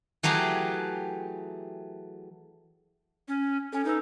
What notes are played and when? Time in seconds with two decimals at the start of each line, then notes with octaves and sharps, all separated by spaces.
0.23 E3 F#3 A3 G4 G#4
3.28 C#4
3.73 C#4 A4 G#5
3.85 D#4 A4 B4 E6